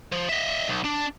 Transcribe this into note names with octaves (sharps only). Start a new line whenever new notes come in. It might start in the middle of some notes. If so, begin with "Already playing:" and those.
F3
D#5 E5
B1
D4